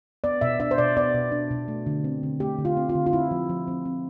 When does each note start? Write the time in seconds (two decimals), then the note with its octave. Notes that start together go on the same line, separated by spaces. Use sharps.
0.24 B3 D5
0.41 B2 E5
0.60 D4 E5
0.71 C5
0.78 B2 D5
0.97 B3 D5
1.15 B2
1.32 D4
1.51 B2
1.68 A3
1.86 D3
2.04 C4
2.23 D3
2.40 A3 G4
2.59 D3
2.65 F4
2.77 C4
2.89 F4
2.95 D3
3.06 F4
3.13 C4 E4
3.31 F3
3.49 F3
3.68 C4
3.85 C4